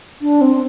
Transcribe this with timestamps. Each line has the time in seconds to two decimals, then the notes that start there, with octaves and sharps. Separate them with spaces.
0.22 D4
0.41 C4